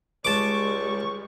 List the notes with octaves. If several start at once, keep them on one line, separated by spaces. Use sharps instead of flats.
C#2 G3 G#3 A5 C#6 D6